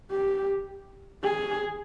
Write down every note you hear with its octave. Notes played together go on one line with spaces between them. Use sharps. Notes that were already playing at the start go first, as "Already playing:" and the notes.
G4
G#4